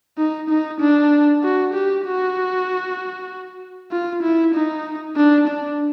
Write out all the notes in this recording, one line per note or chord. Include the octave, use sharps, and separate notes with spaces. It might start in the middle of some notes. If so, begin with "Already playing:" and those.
D#4
D#4
D4
F#4
G4
F#4
F4
E4
D#4
D4
D4